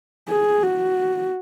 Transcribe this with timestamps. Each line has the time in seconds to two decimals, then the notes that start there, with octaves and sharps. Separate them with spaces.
0.29 G#4
0.63 F#4